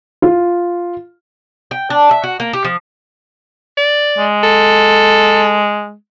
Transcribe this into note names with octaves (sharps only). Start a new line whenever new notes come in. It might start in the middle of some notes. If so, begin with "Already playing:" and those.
F4
G5
D4
E5
F#4
A#3
G4
F3
D5
G#3
A4